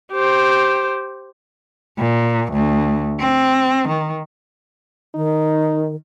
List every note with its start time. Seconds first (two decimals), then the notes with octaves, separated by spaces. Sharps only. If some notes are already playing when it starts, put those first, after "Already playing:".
0.12 G4 C5
1.99 A#2
2.52 D2
3.20 C4
3.88 D#3
5.15 D#3 D#4